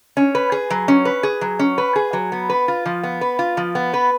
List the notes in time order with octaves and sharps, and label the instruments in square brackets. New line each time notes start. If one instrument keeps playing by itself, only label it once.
[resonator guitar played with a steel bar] C#4
B4
G#4
F#3
C#4
B4
G#4
F#3
C#4
B4
G#4
F#3
B3
B4
F4
F3
B3
B4
F4
F3
B3
B4